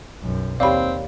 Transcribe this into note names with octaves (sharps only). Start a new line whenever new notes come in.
B1 F#2
D#2 C4 G4 C#5 D5 F5 B5